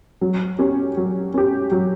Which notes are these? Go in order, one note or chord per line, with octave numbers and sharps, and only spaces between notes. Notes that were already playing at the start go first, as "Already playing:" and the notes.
F#3
C#4 G4
F#3
C#4 G4
F#3